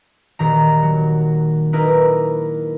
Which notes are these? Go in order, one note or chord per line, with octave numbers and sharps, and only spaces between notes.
D#1 D#3 A#5
F#3
A#3 D#4 E4 A#4 B4